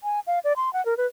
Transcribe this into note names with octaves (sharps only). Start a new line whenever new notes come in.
G#5
F5
D5
C6
F#5
A#4
B4